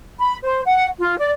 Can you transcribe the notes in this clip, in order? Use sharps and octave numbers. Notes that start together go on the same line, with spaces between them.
B5
C5
F#5
F4
D5